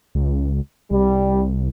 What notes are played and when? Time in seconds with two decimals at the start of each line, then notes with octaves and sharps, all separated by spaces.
0.15 C#2
0.91 C2 G3